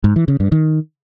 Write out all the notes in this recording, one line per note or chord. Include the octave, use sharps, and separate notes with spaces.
G#2
E3
C#3
G2
D#3